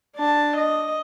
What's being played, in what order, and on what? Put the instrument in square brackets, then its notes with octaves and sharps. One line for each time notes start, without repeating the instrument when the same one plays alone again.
[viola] D4 A5
D#5